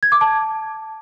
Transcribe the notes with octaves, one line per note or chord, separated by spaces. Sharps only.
G#6
D6
A5